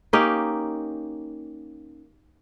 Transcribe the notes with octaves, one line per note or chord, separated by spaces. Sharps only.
A#3 C#4 D#4 G4